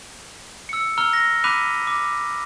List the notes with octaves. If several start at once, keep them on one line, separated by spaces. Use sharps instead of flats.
E6 C#7
A#5 E6 F6 G7
A#6
B5 D6 F#6 B6 D#7 F7
D6